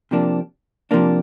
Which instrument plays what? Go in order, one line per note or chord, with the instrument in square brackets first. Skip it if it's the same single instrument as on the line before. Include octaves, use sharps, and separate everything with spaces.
[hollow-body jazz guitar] C3 F3 A#3 D4
C3 F3 A#3 D4